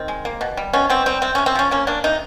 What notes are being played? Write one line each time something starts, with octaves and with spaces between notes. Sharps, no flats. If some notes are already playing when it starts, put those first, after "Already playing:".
Already playing: D#3 C4
G#3
A#3
B2
G3
B2 C#4
B2 C4
G3 C4
C3 C4
C3 C#4
C4
F3 C#4
A#3 C#4
A#3 D4
C3 D#4